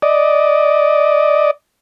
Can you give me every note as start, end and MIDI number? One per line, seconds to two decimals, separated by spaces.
0.02 1.51 74
0.02 1.51 75